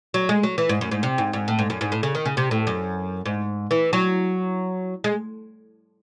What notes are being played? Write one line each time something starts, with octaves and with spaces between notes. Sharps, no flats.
F#3
G#3
F#3
E3
G#2
F#2
G#2
C3
G#2
G#2
A2
G#2
F#2
G#2
A2
C#3
D#3
C#3
C3
A2
F#2
G#2
E3
F#3
G#3